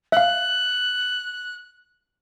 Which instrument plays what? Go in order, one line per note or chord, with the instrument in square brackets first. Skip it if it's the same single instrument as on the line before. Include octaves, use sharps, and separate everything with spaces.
[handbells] E5 F5 [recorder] F#6